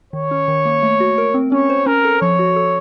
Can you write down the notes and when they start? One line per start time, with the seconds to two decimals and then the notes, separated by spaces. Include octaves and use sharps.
0.13 D#3 C#5
0.31 C#4
0.48 D#3
0.65 A#3
0.82 A3
1.00 F#4
1.18 A#4
1.34 C4
1.52 C#4 C#5
1.70 C5
1.86 C#4 A#4
2.05 A4
2.22 F3 C#5
2.39 F#4
2.56 A4